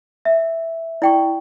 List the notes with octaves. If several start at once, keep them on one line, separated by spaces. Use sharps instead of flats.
E5
E4 D5 G5 C#6